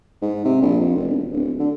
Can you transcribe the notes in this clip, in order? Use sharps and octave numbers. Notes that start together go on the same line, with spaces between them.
G#2
C3
A#1
F2
F1
E1
D1
D3